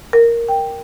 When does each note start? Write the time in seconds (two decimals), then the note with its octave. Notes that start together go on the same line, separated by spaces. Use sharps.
0.13 A#4
0.48 G5